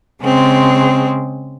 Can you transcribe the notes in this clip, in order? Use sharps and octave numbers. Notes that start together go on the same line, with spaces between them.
C#3 G#3 C4